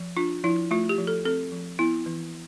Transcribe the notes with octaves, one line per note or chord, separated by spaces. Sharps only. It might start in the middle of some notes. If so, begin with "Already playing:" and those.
Already playing: F3
D4 F4
F3 E4
A3 F4
G4
F3
A4
C4 A4
F3
B3 E4
E3